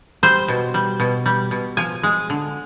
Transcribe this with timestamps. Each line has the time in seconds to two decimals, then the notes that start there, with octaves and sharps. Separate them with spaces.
0.23 G3 C5
0.48 B2
0.74 G3
1.00 B2
1.26 G3
1.51 B2
1.77 F3 G#5
2.03 G#3
2.30 D3